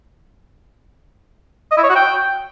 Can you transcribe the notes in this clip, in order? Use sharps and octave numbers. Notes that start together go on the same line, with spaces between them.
D#5
E4
C#5
F#4
G5